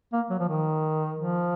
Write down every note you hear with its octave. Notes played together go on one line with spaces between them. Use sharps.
A#3
F#3
F3
D#3
F3